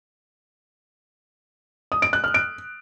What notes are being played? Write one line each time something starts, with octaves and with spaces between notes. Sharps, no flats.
D#6
D7
F#6
F6
D7